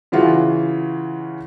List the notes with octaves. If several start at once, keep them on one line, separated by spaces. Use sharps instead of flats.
C#3 E3 F4 F#4